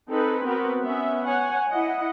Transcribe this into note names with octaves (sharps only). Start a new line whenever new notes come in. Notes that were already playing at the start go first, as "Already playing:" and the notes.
C4 D#4 G#4 A4 B4
B3 C4 F#4 A#4 B4
B3 C#4 E5
C#5 F#5 G#5
E4 D#5 F#5